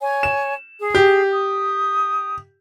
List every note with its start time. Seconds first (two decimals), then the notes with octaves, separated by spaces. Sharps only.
0.01 C#5 G#5
0.23 E7
0.80 G#4
0.95 G4
1.32 D#6